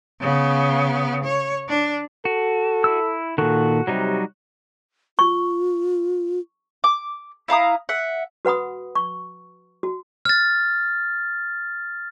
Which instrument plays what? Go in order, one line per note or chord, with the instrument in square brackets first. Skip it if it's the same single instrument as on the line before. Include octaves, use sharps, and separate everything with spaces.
[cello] C#3 B3
C#5
D4
[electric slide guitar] F#4 [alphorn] A4
[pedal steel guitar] E4 E6
[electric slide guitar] A#2 D#3 [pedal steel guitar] F#4 [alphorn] A4
[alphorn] C3 [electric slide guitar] F#3 G3 D#4
[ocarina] F4 [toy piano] C#6
[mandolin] D6
E4 F5 A#5 D#6
E5 F#5
[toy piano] F#4 B4 F#5 B5 D#6
C#6
F#4
[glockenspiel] F6 A6